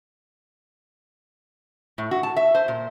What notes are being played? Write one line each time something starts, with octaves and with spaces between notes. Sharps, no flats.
A2
F#4
A5
E5
C5
A#2